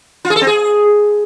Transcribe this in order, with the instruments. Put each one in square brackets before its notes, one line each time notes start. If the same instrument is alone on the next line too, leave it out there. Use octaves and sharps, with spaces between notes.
[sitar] F4
G#4
A4
C4
G#4